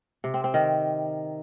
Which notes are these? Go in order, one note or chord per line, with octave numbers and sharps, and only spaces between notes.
C3
C4
C4
D#3